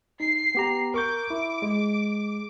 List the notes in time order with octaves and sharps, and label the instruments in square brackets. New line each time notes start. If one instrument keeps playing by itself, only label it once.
[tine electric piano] D#4 [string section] C7
[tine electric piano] B3 G4 A#5
[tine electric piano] A#4 C#6 G6 [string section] D6
[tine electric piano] E4
G#3